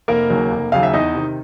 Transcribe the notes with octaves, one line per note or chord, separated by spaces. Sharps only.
F1 A#3 A#4
D#2 C#3 F#3
F1
D#2 C#3 F#3 F5
E5
E2 D#4 D#5
C3 D#3